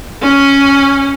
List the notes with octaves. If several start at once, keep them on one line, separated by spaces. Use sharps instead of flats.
C#4